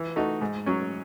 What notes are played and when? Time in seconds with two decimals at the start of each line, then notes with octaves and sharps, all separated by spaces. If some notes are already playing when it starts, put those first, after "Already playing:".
Already playing: E3
0.16 A3 D#4 F#4
0.41 G#2
0.66 F#3 C#4